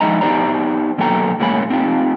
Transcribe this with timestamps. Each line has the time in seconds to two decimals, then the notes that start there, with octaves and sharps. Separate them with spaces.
0.01 F3 G#3 D#4 E4 D#5 A#5
0.21 B3 D#4 G4 C5 D5 A#5
0.98 B2 F#3 A#3 A4 G5 A#5
1.40 A2 G#3 A#3 C#4 B5
1.70 C4 D#4 F4 G4